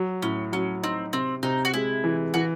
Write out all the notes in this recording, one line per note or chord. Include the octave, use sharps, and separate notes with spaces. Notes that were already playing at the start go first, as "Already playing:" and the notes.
Already playing: F#3
A2 C#4
F#3 C#4
C4 D#4
C3 C4
C3 D#4
F#4
G#3 E4
E3
E3 F#4